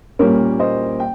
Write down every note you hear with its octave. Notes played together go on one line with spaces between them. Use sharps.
A#2 G3 A#3 C#4 A#4 C#5
C5 D#5
G5